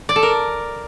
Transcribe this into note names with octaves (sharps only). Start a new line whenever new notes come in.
D5
A4
A#4